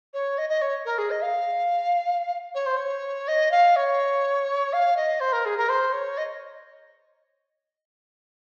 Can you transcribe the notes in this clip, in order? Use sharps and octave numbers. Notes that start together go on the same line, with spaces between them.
C#5
D#5
D#5
C#5
A#4
G#4
D#5
F5
C#5
C5
C#5
D#5
F5
C#5
F5
D#5
C5
A#4
G#4
A#4
C5
C#5
D#5